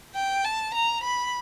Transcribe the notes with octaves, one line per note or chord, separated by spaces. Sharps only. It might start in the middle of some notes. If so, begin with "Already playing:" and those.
G5
A5
A#5
B5